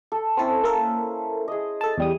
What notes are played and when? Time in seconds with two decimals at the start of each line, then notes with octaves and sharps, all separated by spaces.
0.12 A4
0.37 C4 C#4 E4 A4 C5
0.64 A#3 A4 A#4
1.48 G#4 D#5
1.81 A4 A5
1.98 E2 G3 D#6